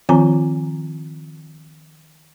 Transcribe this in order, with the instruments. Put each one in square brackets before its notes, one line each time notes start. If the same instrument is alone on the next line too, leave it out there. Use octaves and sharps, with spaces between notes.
[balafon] D#3 F3 C4 F4 G#5 A#5